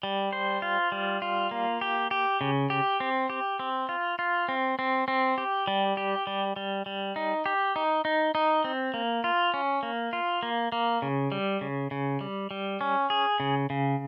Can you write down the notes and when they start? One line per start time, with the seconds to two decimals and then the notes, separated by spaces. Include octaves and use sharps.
0.03 G3
0.33 C5
0.62 F4
0.92 G3
1.22 F4
1.51 A#3
1.81 G4
2.11 G4
2.41 C#3
2.70 G4
3.00 C4
3.30 G4
3.59 C4
3.89 F4
4.19 F4
4.49 C4
4.79 C4
5.08 C4
5.38 G4
5.67 G3
5.97 G4
6.27 G3
6.56 G3
6.86 G3
7.16 D#4
7.46 G4
7.76 D#4
8.05 D#4
8.35 D#4
8.64 C4
8.94 A#3
9.24 F4
9.54 C#4
9.83 A#3
10.13 F4
10.43 A#3
10.72 A#3
11.02 C#3
11.32 G3
11.61 C#3
11.91 C#3
12.21 G3
12.51 G3
12.81 C#4
13.10 G#4
13.40 C#3
13.70 C#3